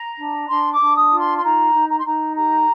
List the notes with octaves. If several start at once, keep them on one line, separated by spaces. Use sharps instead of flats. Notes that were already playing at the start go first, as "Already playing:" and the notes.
Already playing: A#5
D4
D4 C6
D6
D4
D#6
F4
C6
C6
D#4 A#5
D#4
A#5
C6
D#4 A#5
G4 A#5